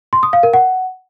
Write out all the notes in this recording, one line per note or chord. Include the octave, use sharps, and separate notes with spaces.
C6
D#6
F5
A#4
F#5